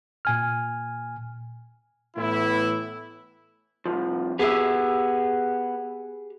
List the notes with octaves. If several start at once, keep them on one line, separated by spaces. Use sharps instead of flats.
A#2 G#5 F6
A2 E3 B3 E4
C2 F#2 F3
B3 G4 G#4 E5